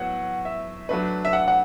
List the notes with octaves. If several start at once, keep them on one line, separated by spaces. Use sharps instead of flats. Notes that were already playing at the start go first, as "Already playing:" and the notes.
Already playing: A2 F#3 B3 F#5
E5
F#3 A3 D4 B4
E5
F#5
F#5